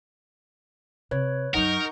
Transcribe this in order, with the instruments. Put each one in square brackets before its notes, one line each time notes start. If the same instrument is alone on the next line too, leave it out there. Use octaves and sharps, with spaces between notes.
[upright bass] C3 [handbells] B4 C#5
[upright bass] F#2 F#3 [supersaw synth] D#4 C#6 G6 [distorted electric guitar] A#4 [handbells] F#5